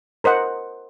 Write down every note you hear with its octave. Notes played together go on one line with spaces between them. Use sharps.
A#4 C5 D#5 F#5